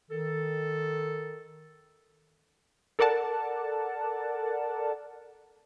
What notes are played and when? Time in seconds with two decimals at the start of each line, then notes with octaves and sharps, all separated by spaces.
0.11 D#3 A4
2.99 A4 A#4 D5 F#5 A5